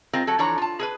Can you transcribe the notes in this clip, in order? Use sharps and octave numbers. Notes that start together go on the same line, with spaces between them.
G#3 C4 F4 A#4
F#3 A4
E3 F3 D4 A4 C#5 A#5
F4 A5
G#4 A#4 B4